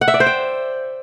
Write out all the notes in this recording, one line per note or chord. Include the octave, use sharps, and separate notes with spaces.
F#5
E5
D5
C5
G5